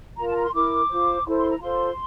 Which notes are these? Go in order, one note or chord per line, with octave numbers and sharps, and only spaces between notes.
F4 A#4 A#5
A5
A#5
C6
E4 A#4 D6
F4 C5
E4 A4 C5 C6
C6
A#5
F4 A4 C5 C6